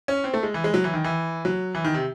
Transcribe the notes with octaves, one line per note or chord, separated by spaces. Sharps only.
C#4
C4
A3
G#3
E3
G#3
F#3
E3
D#3
E3
F#3
E3
D#3
C3